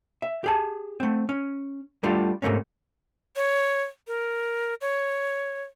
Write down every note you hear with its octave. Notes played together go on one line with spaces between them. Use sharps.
E5
G4 G#4 A5
A3 C4
C#4
G3 A3 D4 F4 G4
G#2 C3 A3 A#3 C#4
C#5
A#4
C#5